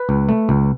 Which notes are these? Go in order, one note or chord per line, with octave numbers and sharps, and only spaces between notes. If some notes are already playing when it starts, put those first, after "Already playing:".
Already playing: B4
C#2
A3
C#2